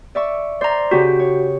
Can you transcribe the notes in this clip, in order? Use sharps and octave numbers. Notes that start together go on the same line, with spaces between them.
D5 E5 C#6
C5 D5 A#5
C#3 C#4 F#4 G4
C#5